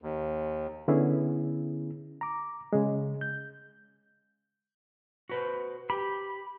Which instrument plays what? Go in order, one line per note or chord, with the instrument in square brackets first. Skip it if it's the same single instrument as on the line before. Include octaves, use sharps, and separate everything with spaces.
[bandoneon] D#2
[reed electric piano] D3 B3 C#4 E4 G#4
A#5 D6
C#3 G#3
G6
[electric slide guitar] F#4 B4 C5
[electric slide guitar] G4 [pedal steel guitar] B5